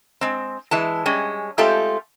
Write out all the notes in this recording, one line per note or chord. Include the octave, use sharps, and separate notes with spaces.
G#3 C4
E3 G#3 A5
G3 G#3 C#4
G#3 A3 C4 F4 G4 A4